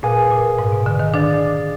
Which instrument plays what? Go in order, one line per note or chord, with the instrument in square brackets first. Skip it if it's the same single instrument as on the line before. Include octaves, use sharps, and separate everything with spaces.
[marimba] A#2 [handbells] G#4 B4 F5 G#5
[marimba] A#2
G#2
B2
D3
D#3
[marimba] D4 [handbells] G#4 D5 F5